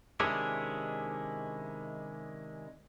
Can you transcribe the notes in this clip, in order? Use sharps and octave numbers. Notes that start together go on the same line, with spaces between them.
C3 D#3 G#3 C#4 D4 E4